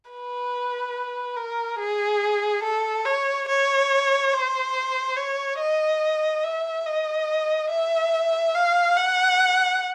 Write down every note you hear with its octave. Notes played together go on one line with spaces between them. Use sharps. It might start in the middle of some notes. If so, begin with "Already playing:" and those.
B4
A#4
G#4
A4
C#5
C#5
C5
C#5
D#5
E5
D#5
E5
F5
F#5